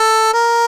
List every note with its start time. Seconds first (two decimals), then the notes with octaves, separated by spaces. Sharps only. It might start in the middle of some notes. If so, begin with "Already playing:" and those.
Already playing: A4
0.33 A#4